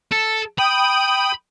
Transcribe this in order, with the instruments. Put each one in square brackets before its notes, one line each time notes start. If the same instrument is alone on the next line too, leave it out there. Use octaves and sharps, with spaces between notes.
[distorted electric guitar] A4
[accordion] G5 D#6 [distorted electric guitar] B5